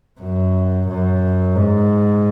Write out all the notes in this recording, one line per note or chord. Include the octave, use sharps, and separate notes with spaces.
F#2
F#2
G#2